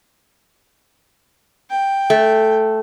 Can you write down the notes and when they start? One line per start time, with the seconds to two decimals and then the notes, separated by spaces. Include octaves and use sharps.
1.70 G5
2.10 A3